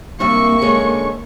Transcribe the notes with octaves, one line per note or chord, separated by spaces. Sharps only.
G2 C3 A#3 E5 C#6
D3 G#3 C#4